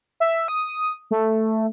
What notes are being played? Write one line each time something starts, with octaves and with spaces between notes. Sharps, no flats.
E5
D#6
A3